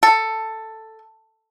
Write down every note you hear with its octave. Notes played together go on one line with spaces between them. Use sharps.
A4